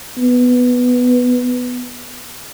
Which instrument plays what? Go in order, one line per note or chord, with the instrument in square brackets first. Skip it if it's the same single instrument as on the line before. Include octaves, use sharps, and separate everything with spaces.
[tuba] B3